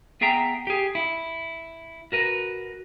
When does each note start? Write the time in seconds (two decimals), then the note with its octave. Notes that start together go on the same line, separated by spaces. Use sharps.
0.21 B3 G#4 E5 G5 A#5
0.67 G4 G#4
0.95 E4
2.12 F#4 A#4 B4